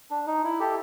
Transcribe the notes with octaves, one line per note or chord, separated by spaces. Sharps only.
D4
D#4
E4
G4 A4